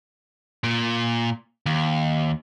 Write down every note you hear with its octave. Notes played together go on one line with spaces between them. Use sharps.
A#2
D#2